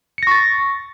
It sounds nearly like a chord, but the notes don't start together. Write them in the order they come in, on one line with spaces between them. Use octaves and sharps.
C#7 A#6 C#6 A6